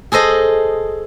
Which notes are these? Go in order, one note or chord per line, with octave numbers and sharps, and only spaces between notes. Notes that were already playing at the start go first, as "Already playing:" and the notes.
G#4 A4 C5 D#5